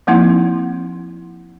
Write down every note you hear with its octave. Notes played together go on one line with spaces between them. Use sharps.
F3 A#3 C4 D#4 E4